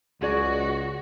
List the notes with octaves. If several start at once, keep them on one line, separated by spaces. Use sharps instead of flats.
C#2 F#3 F#4 G#4 D5